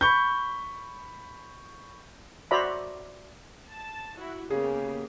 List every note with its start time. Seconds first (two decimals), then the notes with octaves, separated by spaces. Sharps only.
0.01 B5 C#6 G6
2.51 F#4 C5 D5 E5 A#5 B5
3.68 A5
4.17 E4 F#4
4.50 C#3 A#3 B3 G4 G#4